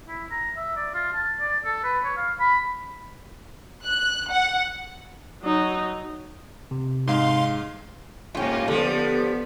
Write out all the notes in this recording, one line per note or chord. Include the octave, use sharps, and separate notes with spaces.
E4
A#5
E5
D5
F4
A5
D5
A4
B4
C#5
F5
B5
F#6
F#5
F#3 D#4
C3
G#2 G#3 D#4 F5 C6
G#2 A#3 C#4 F4 G4
D3 F3 G3 B3